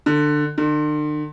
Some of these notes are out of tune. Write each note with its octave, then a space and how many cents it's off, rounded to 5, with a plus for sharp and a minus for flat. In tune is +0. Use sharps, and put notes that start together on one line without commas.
D3 +20
D3 +45